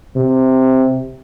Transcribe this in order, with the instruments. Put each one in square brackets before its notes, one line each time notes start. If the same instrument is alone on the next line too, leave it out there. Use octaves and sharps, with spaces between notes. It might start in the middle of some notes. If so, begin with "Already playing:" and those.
[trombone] C3